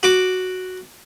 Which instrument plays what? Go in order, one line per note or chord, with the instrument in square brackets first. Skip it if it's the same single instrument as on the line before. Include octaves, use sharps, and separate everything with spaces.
[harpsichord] F#4 D6